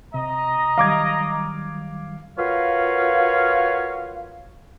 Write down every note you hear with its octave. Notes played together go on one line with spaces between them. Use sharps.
C3 D#5 A#5
D#3 F#3 G3 F5 D6 G#6
F4 F#4 A#4 B4 C#5 F5